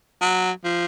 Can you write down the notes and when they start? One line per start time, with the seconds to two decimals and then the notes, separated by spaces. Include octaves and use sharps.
0.21 F#3
0.64 F3